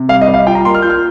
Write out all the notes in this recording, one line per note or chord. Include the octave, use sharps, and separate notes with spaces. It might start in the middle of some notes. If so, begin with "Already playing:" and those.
Already playing: C3
G3 F5
D#5
G3
F5
F4 G5
A#5
A#3 C6
F6
F4 G6
F6